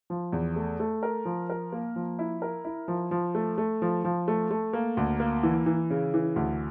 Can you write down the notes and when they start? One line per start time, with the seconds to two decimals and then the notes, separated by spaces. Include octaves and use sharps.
0.10 F3
0.33 E2
0.56 A3
0.80 A3
1.03 A#4
1.25 F3
1.50 A#4
1.72 A#3
1.96 F3
2.19 E4
2.42 A#4
2.65 E4
2.88 F3
3.11 F3
3.35 A3
3.58 A3
3.82 F3
4.04 F3
4.28 A3
4.51 A3
4.73 A#3
4.97 D2
5.20 A#3
5.43 E3
5.66 E3
5.90 C#3
6.14 E3
6.36 D2